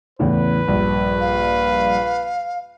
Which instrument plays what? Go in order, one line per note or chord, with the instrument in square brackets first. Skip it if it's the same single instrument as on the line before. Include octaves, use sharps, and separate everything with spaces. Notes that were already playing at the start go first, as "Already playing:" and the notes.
[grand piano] E2 A2 C#3 [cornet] B4
[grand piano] A#1 G2
[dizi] F5